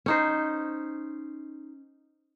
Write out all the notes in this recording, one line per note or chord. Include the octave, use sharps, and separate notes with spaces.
C#4 D#4 C5